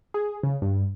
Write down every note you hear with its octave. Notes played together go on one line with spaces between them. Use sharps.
G#4
C#3
G2